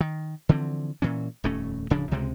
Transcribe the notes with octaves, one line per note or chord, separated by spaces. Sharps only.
D#3
D3 E3 F3 C4
A#2 E3 C#4
D#1 F2 A3 C#4
D1 C#3 F3 D4
C#2 C3 G#3 C4